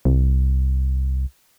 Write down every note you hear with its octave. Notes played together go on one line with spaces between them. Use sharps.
C2